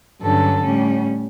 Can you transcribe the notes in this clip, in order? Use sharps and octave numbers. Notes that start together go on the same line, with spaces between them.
G2 D3 F#3 C#4 A4
A2 G3 C#4